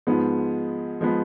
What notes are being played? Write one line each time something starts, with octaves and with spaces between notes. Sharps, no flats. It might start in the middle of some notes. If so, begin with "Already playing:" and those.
G#2 F3 G#3 B3
F3 G#3 B3